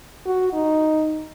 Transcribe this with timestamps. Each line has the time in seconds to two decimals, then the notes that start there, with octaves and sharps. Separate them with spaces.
0.26 F#4
0.53 D#4